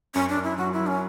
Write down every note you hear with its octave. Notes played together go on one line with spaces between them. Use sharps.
F#2 C#4
D4
F#2
E4
F#3 F#4
E4
F#3
C#4